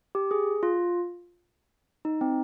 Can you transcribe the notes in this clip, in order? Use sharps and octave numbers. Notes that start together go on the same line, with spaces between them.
G4
G#4
F4
D#4
C4